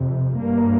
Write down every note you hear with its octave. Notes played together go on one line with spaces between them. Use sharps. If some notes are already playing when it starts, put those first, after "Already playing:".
Already playing: F2 C3
G2 A#3